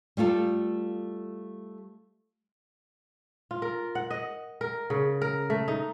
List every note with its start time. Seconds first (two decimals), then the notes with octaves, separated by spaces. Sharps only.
0.17 G3 A3 F4 A4
3.51 F4
3.62 A#4
3.95 F#5
4.11 D#5
4.61 A#4
4.90 C#3
5.22 A#4
5.50 A3
5.68 D#4